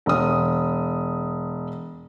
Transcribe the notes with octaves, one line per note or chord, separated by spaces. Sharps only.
E1 D#6